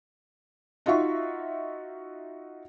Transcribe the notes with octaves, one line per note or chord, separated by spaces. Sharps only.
D#4 F4 F#4 E5 C#6